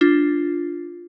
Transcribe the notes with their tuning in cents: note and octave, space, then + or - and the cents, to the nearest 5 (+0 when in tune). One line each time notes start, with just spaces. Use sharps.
D4 +0 F4 +0